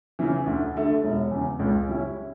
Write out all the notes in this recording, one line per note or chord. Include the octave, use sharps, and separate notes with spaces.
C#3 E3
D2
D3 A3
E1
E2 C#3
C#2
C#3 G3 C#4 E4